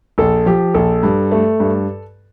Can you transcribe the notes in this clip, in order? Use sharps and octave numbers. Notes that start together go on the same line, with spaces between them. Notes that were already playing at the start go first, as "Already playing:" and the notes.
A#1 A4
F3 G4
A#1 A4
G2
A3
G2